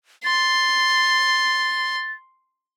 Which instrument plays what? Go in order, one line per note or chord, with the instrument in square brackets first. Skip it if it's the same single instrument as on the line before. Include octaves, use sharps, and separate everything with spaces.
[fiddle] C6 [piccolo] A6